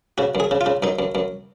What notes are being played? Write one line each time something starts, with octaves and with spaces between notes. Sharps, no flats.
C#3 F#4
F#2
G#4
C#3
F4
C#3
F#2 D#4
F#2
F#2